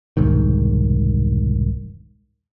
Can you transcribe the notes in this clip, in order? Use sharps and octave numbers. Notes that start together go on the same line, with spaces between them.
E1 C2 G#2 D#3